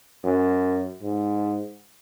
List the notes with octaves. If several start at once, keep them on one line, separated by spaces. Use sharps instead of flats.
F#2
G#2